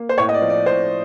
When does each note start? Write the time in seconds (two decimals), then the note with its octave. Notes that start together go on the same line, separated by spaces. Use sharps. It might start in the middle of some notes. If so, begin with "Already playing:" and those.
Already playing: A#3
0.09 C5
0.18 A2 C#5
0.29 D#5
0.34 D5
0.42 F3
0.50 D5
0.66 A2 C5